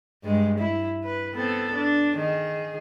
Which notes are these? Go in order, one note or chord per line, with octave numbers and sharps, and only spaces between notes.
G2 G#3
E4
B4
B3 C4 A4
D4
D#3 G#4